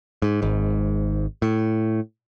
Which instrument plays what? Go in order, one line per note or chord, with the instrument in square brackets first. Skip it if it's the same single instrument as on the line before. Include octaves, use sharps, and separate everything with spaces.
[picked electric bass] G#2
G#1 G#2
A2